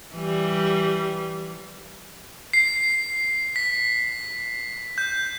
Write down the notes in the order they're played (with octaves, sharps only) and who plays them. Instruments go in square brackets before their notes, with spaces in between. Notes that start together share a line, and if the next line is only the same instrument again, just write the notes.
[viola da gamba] E3 G3
[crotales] C7
B6
G6